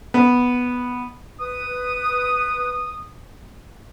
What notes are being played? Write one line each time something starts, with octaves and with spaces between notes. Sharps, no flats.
B3
B4 D#6